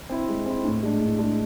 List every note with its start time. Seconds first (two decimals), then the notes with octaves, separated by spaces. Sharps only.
0.09 C4 E4
0.28 G#3
0.46 C4 E4
0.64 A2
0.83 G#3 D4
1.01 A2
1.19 G#3 D4